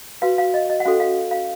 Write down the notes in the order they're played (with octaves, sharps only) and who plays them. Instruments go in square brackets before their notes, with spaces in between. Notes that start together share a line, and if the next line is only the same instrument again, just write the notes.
[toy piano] F#4 B4 F5
F5
D#5
D#5
F#5
C#4 F#4 A4 F5
F5
F5